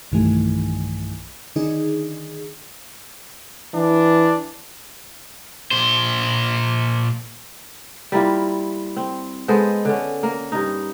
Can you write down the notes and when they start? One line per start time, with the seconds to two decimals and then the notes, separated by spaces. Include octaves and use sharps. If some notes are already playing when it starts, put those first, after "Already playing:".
0.12 B1 G2 D#3 E3 A3 G#5
1.56 D3 D#3 D4 D#4 G#4
3.74 E3 D4
5.71 A#2 C5
8.12 G3 A#3 E4 F4
8.96 C4
9.48 G#3 B3 A4 C5
9.85 D3 C#4
10.23 A#3
10.52 G2 D#4